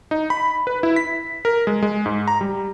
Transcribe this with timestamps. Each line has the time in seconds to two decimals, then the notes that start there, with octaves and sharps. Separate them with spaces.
0.11 D#4
0.30 B5
0.67 B4
0.83 E4
0.96 B6
1.45 A#4
1.67 G#3
1.82 G#3
2.06 G#2
2.28 A#5
2.41 G3